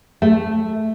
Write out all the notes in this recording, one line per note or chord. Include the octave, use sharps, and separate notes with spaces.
A3